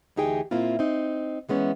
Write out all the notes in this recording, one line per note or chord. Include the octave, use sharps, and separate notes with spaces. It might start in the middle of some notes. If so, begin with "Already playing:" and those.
D2 E3 D#4 G4 G#4 G5
A#2 A#3 C4 E4 F4
C4 D#4
E3 G#3 B3 C#4